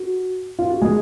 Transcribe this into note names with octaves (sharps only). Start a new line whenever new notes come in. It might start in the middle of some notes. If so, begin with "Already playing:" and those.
Already playing: F#4
F4
F#4
G#3 G#4